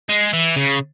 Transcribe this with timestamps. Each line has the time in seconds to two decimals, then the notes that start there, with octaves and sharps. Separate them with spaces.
0.09 G#3
0.33 E3
0.56 C#3